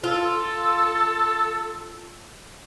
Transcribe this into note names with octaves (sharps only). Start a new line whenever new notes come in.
F4 A4